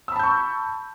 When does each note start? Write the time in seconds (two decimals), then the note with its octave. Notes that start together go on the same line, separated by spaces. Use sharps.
0.08 E6
0.12 B5
0.16 A5
0.19 G6
0.23 C#6